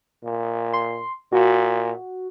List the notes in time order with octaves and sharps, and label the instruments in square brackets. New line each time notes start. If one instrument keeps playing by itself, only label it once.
[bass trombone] A#2
[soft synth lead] C6
[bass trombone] A#2 [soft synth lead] F#4